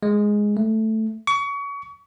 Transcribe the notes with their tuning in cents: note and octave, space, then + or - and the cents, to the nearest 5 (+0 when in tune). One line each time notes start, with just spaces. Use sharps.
G#3 +0
A3 +0
C#6 +30